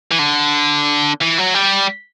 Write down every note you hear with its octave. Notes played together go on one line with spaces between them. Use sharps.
E3
D3
E3
F#3
G3